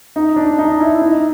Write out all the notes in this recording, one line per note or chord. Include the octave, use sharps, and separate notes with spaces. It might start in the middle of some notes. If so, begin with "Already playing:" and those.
D#4
D4
D#4
E4
D#4